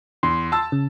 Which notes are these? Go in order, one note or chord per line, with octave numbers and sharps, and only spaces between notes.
E2 C6
A5 E6 A6
C#3